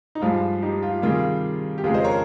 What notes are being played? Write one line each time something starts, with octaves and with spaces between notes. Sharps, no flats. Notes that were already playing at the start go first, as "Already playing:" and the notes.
D#4
G2 F3 G#3 F4
D#4 G4
F4
C3 D#3 G3 F4 G#4
G4
F2 C#3 G#3 F4 G#4
C5 D#5
A#4 C#5